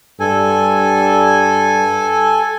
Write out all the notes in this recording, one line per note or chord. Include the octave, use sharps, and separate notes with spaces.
G2 A4 G#5